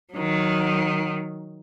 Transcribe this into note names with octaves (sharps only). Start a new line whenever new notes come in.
D#3 F#3